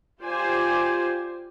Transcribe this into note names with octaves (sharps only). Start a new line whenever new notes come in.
F4 G4 C5 D5 G#5